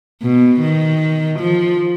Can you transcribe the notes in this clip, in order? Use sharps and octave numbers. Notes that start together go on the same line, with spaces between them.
B2
D#3
F3